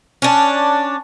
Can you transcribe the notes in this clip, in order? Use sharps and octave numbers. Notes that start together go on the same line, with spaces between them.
C#4 D4